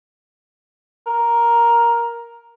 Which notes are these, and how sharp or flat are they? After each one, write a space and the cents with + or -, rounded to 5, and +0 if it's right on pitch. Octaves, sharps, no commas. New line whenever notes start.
A#4 +5